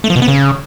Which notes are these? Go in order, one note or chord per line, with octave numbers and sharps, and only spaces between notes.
A3
F3
B2
B3
C#3